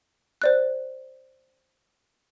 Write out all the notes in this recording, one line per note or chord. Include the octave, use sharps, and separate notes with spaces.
C5 D5 F#6